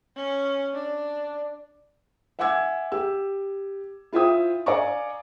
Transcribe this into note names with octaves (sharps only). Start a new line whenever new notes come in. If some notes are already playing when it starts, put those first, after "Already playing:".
C#4
D4
E5 F#5 G#5 D6 E6 G#6
G4 E6
E4 F4 C5 E5 G5 D#6
D5 F5 G#5 A#5 C#6 D6